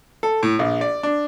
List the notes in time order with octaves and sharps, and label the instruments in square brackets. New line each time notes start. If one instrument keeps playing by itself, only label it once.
[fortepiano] A4
A2
A#1
D5
D4